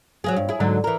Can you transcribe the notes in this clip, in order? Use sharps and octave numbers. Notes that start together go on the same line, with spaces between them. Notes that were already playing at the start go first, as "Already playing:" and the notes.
F#3 A#3 G#4
G2
E4 G#4
G#2 D3 F#3
E3 A#4